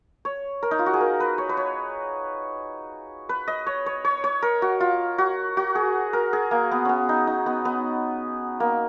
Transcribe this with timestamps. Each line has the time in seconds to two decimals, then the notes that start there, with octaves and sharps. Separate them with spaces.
0.25 C#5
0.63 A#4
0.71 D#4
0.79 F4
0.86 F#4
0.93 G#4
1.00 A#4
1.20 B4
1.38 C#5
1.49 B4
1.57 C#5
3.29 B4
3.48 D#5
3.67 C#5
3.86 C#5
4.05 C#5
4.24 C#5
4.42 A#4
4.62 F#4
4.80 F4
5.18 F#4
5.57 F#4
5.75 G#4
6.13 A#4
6.33 G#4
6.51 A#3
6.71 B3
6.85 B3 C#4
7.09 D#4
7.27 D#4
7.46 B3
7.65 B3
8.60 A#3